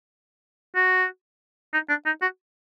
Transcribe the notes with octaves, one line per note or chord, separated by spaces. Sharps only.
F#4
D#4
D4
D#4
F#4